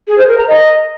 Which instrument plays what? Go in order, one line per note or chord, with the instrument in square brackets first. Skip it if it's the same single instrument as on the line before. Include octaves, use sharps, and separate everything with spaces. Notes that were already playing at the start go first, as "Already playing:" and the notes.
[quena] G#4
C5
A#4
A#5
D#5